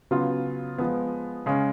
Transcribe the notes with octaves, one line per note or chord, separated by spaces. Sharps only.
C#3 F#3 B3 F4
F3 G#3 B3
C#3 G#3 C#4